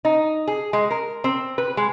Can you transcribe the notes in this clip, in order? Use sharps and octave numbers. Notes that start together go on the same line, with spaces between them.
D#4
G#4
G#3
A#4
C4
B4
G#3